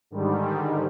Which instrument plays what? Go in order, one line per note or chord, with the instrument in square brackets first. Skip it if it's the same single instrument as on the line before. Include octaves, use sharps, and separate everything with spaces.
[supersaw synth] G#2 D3 D#3 G3